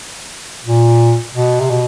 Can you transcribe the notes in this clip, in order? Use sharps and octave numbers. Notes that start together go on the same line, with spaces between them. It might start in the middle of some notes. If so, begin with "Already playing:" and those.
A#2
B2
C3
B2